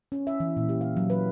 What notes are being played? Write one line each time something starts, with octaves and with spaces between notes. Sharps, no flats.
C#4
E5
E3
A#2
G4
F5
F#3
B4